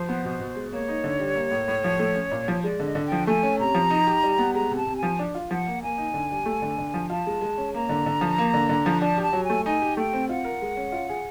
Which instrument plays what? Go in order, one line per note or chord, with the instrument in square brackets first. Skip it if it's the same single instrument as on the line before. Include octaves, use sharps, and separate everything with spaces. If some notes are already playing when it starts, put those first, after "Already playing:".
Already playing: [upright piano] F3 [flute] C5
[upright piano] B3
B2
B2
G#3
[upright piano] A#3 [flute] C#5
[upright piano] D#4
D3
G3
A#3
A2
A2
F3
A3
C#4
A#2
[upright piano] F3 [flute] C#5
[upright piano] G#3 [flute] D5
[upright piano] D3 [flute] D#5
[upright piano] D3
[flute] G5
[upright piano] F3
[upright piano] A3 [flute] G#5
[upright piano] C#4
[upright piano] C3 [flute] A#5
[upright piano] F3
D#4
G4
G3
B3
[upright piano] G#3 [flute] A#5
[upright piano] C3
[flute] A5
[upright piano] C3
[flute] G#5
[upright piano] F3
D4
F4
[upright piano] F3 [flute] F#5
[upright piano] A#3
[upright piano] A#3 [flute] G#5
[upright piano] D#4
D3
G3
A3
D3
D3
F3
[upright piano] F4 [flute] A5
[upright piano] G#3
G#3
C#4
[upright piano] A#3 [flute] A#5
[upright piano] D3
D3
F3
A#3
D3
D3
F3
[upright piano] D4 [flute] A5
[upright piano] G4 [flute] A5
[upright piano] F#3
[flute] G#5
[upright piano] A3
[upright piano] D#4 [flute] G#5
[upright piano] G4
[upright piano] A3 [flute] G5
[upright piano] C4
[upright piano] F4 [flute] F#5
[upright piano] A#4
G#3
C#4
F4
G#4